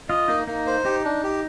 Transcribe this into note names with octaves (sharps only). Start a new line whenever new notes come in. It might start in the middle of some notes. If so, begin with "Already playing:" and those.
F4 D#5
A#3 D#4
A#3 D#4
C5
D#4 G4
D4
G4